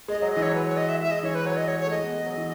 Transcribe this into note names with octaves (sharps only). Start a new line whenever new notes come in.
G#3 D#5
F#3 D#5
E3 D#5
C#5
F#3 B4
C#5
D#5
E5
G#3 E5
D#5
E3 C#5
B4
F#3 C#5
D#5
G#3 C#5
C#5
A3
G#3 D#5
B3
G#3
F#3
E3